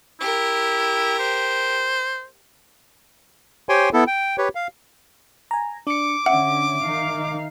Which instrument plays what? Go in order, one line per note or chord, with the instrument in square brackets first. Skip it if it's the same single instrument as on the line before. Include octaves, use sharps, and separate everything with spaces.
[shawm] E4 [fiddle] G4 A#4
[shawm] C5
[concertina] G4 C5 C#5 G5 G#5 C6
B3 E4 A4
G5
G4 B4 C#5
F5
[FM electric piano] G#5 A#5
[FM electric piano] D4 C#7 [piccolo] D6
[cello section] D3 C#4 [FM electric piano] E5 [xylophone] F#5
[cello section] D#3 D#4 F5